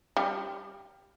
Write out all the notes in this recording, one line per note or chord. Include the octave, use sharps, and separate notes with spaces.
G3 G4